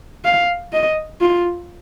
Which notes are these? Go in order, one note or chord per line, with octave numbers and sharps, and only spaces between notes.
F5
D#5
F4